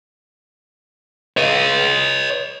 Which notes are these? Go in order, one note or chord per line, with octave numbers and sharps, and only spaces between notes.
C#5 D#5